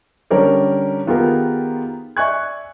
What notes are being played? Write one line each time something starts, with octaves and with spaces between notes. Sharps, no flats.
D3 G3 C#4 A#4 C#5 D5
D#3 B3 F4 G4 G#4 A#4
D5 E5 G#5 C#6 F#6 G#6